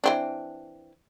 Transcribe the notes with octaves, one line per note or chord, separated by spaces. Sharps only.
E3 C4 D4